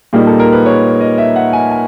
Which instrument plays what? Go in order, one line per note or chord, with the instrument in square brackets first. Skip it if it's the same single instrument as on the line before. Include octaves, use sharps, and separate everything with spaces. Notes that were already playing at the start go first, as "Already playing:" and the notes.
[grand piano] A#2 G3 A#3 D#4 G#4
A4
A#4
B4
C#5
D#5
E5
F#5
G#5
G#5